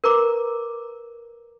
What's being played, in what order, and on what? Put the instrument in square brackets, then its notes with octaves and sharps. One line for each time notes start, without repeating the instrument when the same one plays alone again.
[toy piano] A#4 B4 A#5 D6